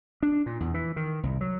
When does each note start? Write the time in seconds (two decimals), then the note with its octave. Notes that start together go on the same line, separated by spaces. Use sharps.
0.23 D4
0.46 A#2
0.60 E2
0.74 E3
0.96 D#3
1.23 C2
1.41 F#3